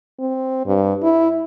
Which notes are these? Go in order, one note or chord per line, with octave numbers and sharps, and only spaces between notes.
C4
G2
E4